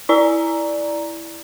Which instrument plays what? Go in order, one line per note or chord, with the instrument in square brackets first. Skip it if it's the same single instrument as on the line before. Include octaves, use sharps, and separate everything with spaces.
[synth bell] E4 D5 A#5